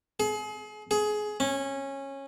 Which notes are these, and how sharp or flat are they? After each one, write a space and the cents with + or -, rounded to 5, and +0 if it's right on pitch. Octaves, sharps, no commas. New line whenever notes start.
G#4 +35
G#4 +20
C#4 -15